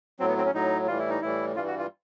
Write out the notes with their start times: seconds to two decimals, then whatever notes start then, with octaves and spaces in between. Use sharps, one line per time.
0.20 A2 F#3 C4
0.28 B3
0.37 C4
0.45 C#4
0.53 A2 F#3 D#4
0.87 A2 E3 G3 F4
0.99 E4
1.09 D#4
1.21 A2 E3 G3 E4
1.55 G2 E3 G3 F4
1.67 F#4
1.79 F4